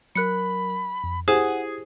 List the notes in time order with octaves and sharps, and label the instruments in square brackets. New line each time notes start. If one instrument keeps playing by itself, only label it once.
[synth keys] F#3 A#4 [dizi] B5 [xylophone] F#6 C#7
[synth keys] F2
[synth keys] E4 G4 [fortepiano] G#4 [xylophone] C5 E7 [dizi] F#5